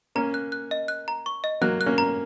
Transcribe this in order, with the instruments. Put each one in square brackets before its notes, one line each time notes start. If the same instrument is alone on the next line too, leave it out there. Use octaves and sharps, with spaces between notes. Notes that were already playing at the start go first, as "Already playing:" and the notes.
[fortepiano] A#3 C#4 [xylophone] A#5
[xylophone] F#6
F#6
D#5
F#6
A#5
C#6
D#5
[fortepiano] F#3 A#3 [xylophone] F#6
[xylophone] F#6
[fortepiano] A#3 C#4
[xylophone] A#5